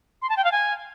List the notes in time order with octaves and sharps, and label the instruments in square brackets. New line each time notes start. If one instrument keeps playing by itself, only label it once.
[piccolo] C6
A5
G5
F5
G#5